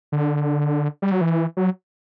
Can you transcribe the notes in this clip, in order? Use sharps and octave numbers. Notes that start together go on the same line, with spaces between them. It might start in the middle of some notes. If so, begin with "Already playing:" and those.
D3
G3
F#3
E3
F#3